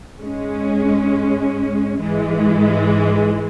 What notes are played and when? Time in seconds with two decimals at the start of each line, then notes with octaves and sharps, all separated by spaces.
0.19 G#2 G#3 C#4
1.98 G#2 E3 G#3